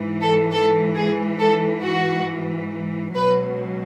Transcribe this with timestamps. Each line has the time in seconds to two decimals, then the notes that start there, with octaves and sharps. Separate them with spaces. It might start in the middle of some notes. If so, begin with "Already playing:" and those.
Already playing: G#2 E3
0.22 A4
0.51 A4
0.95 G#4
1.39 A4
1.83 F#4
3.15 C#2 B2 F#3 B4